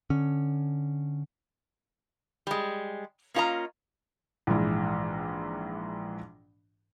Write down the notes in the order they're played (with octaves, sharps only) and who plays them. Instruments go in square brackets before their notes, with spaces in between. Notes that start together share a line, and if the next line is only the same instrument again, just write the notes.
[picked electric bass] D3 C#4
[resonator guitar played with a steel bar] G3 G#3
A#3 C#4 F4 G#4 D#5 A#5
[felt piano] A#1 G#2 E3